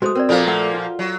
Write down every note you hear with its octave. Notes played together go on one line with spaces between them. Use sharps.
G#3 A3 F#4 C5 D#6
C4 A#4 C5 D5
A#2 F3 A#3 F4 A4 D5
A3 F#5
F4
F#3